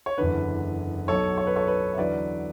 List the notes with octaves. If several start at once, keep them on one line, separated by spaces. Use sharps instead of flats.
C#5
F#1 E2 D3 B4
B1 B2 F#3 A4 C#5
C#5
B4
A4 C#5
B4
E5
E2 D3 F#3 B4 D5